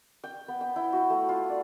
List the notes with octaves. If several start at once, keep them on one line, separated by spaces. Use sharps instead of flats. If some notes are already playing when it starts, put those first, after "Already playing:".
G5
B3
G5
E4
F#4
A3
F4
D5